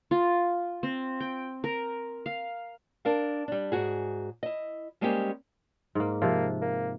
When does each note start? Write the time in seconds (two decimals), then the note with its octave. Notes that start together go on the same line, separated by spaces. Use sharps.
0.11 F4
0.83 C4
1.20 G5
1.64 A#4
2.26 F5
3.05 D4 A#4 F5
3.48 G3 D4
3.72 G#2 F#4 G#4
4.43 E4 D#5
5.01 G3 G#3 A#3 C4 C#4 G4
5.95 G#2 A#3
6.22 C3 F3 A#3
6.62 A#3